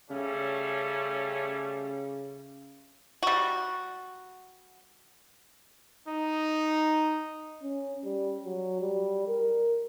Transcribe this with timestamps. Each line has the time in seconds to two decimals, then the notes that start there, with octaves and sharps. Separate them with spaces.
0.10 C#3 G3 A3 C#4
3.23 G3 F#4
6.06 D#4
7.63 C#4
8.04 G3
8.45 F#3
8.81 G3
9.28 A#4